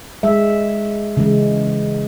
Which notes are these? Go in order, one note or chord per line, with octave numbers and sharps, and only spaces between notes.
G#3 E5
C#3 E3 G#3